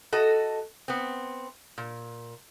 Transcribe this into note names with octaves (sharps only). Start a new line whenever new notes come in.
F#4 A4 D#5
B3 C4
A#2